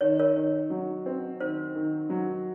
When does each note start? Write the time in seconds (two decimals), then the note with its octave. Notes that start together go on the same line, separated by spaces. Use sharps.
0.01 D#3 C#5
0.19 A#4 C#5
0.36 D#3
0.70 F#3
1.06 C4
1.40 D#3 C5
1.75 D#3
2.10 F#3